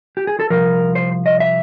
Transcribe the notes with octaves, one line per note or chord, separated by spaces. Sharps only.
G4
G#4
A4
C2 A#2 F3 A#4
C5
D#5
E5